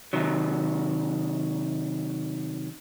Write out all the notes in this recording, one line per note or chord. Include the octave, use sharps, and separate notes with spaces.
C3 D#3 F#3